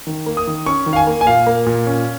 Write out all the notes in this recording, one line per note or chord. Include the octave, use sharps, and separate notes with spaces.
D#3
A#3
D#6
D#3
C#4 C#6
D#3
F5
G#5
A#3
G#5
A#2 F5
A#3
A#2
C#4